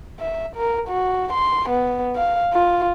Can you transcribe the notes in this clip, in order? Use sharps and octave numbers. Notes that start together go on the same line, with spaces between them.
E5
A#4
F#4
C6
B3
F5
F4